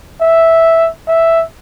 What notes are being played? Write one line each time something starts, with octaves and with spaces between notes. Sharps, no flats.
E5
E5